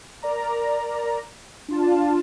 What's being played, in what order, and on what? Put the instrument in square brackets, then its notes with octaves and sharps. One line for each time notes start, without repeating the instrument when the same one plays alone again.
[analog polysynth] A#4 D5 A#5
D4 F4 A5